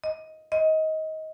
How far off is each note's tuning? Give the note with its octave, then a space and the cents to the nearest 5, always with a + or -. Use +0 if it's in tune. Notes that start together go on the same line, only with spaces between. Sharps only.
D#5 +10
D#5 +20